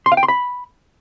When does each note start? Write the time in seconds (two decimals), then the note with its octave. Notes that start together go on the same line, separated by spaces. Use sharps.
0.06 C6
0.12 F5
0.17 G5
0.23 C6
0.28 B5